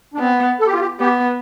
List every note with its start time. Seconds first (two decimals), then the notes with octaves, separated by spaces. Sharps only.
0.14 D4
0.19 B3 C4
0.60 A4
0.67 G4
0.73 F4
0.81 G4
1.00 B3 G4